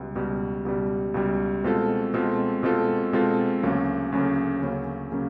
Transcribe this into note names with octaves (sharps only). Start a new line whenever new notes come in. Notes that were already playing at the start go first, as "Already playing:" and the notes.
Already playing: C#2 B2 G3
C#2 B2 G3
C#2 B2 G3
C#2 B2 G3
B2 G#3 C4 F4 A4
B2 G#3 C4 F4 A4
B2 G#3 C4 F4 A4
B2 G#3 C4 F4 A4
D2 C#3 F#3 A#3 C#4
D2 C#3 F#3 A#3 C#4
D2 C#3 F#3 A#3 C#4
C#3 F#3 A#3 C#4